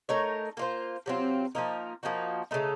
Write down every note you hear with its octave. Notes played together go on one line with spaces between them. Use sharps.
A3 D#4 A#4 C#5
A#3 F4 C5
C3 F#3 C4 F4
F3 A#3 D#4 A#4
F3 A#3 D#4 F#4
C#3 A3 D#4